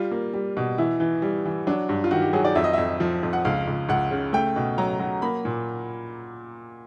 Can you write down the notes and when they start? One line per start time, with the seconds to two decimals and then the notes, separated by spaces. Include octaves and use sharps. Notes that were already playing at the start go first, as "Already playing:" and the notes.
Already playing: G3 F4
0.11 A#3
0.34 G3
0.57 B2
0.78 E3 E4
1.00 E3
1.22 G3
1.45 E3
1.67 F#3 D4
1.89 G2
2.04 F4
2.11 D#3 F#4
2.22 G4
2.33 F#3 G#4
2.44 D5
2.55 F2 E5
2.64 D#5
2.73 F2 E5
3.00 F3
3.23 F2
3.33 F#5
3.45 C#2 F5
3.67 C#2
3.89 C#2 F#5
4.11 C#3
4.33 A3 G5
4.56 B2
4.78 F#3 A#5
4.99 F#3
5.22 A#3 B5
5.45 A#2